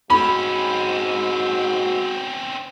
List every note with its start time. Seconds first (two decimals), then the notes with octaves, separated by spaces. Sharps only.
0.10 G#2 C4 C#4 F#4 B5